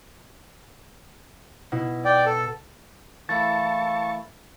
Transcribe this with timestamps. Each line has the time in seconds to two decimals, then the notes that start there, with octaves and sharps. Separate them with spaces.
1.72 B2 E4
2.05 D5 G5
2.26 A4
3.29 E3 A3 A#3 E4 A5 C#6 A6